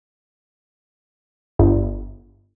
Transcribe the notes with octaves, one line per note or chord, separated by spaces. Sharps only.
G1